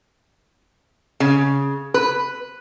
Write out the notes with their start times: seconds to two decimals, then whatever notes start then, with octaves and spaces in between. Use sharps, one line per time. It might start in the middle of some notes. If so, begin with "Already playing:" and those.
1.20 C#3
1.94 B4